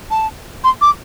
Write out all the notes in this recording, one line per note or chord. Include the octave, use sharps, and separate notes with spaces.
A5
C6
D6